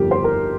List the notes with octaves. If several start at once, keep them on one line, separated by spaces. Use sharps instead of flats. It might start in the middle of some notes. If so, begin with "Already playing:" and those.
Already playing: G1 F2 F3 G4 A#4
C5
A#4